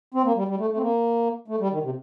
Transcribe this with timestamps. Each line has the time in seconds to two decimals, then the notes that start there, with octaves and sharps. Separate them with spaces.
0.14 C4
0.25 A#3
0.36 G3
0.48 G3
0.59 A3
0.71 A3
0.77 C4
0.81 A#3
1.48 A3
1.60 G3
1.71 D#3
1.83 C3